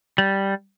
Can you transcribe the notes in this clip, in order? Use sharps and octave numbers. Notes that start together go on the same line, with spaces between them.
G3